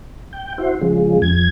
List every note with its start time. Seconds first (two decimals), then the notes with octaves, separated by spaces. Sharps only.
0.33 G5
0.58 E4 F#4 C5
0.82 C#3 F3 G#3
1.22 F2 G#6